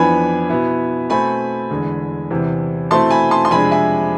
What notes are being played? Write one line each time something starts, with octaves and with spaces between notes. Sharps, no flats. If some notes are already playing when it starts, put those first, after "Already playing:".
Already playing: F2 E3 B3 D4 G#5 B5
B2 B3 E4
B2 A3 C4 G#5 B5
E2 D3 G#3
E2 C3 E3
B2 A3 C4 E4 A5 C6
G#5 B5
A5 C6
C6
F2 C3 G#3 D4 G#5 B5
E5 G#5